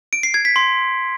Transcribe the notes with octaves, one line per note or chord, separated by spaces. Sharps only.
D7
C7
G#6
B6
C6